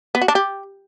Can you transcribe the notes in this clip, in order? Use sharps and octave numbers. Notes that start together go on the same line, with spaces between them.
B3
F#4
D4
G4